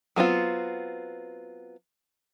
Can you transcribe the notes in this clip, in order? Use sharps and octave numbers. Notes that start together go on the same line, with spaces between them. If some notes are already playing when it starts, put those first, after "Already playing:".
F#3 B3 C4 F4